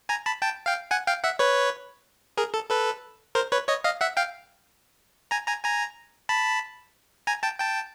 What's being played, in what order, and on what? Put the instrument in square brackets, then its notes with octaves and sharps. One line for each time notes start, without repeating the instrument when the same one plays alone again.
[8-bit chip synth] G#5 A#5
A5 B5
G5 A5
F5 G5
F#5 G#5
F5 G5
E5 F#5
B4 C#5
G#4 A#4
A4
A4 B4
A#4 C5
B4 C#5
C#5 D#5
D#5 F5
E5 F#5
F5 G5
G#5 A#5
G#5 A#5
G#5 A#5
A5 B5
G#5 A#5
G5 A5
G5 A5